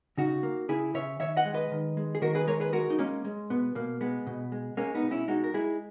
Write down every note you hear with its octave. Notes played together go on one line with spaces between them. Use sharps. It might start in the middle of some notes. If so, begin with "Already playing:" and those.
C#3 D#4 F#4
A#3
C#3 E4 G#4
C#3 C#5 E5
D#3 C#5 E5
D#5 F#5
G#3
B4 D#5
D#3
G#3
G#4
D#3 F#4 A#4
G#4 B4
G#3 A#4 C#5
G#4 B4
G#3 F#4 A#4
D#4
G#3 A#3 C#4
G#3
B2 B3
B2 A#3
G#3 B3
B2
G#3
G#3 A#3 C#4
B3 D#4
B2
C#4 E4
G#3 D#4 F#4
A#4
G#3 E4 G#4